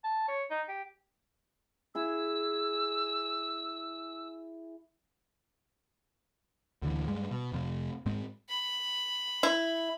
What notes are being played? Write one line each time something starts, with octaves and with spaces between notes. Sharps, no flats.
A5
C#5
D#4
G4
E4 G#4 E6
D2 D3 E3
G2 G3 G#3
B2
F1 F2 C3
G#2 G#3 C4
B5
E4